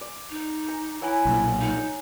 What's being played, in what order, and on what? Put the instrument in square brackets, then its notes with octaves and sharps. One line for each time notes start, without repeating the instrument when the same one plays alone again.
[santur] D5
[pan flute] D#4
[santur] A#5
[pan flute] E4 [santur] C#5 F#5 G#5
[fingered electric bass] B1 A#2
[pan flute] D#4